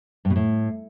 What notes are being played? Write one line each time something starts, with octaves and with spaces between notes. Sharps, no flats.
G2
B2
A2